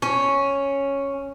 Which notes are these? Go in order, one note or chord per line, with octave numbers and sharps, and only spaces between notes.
C#4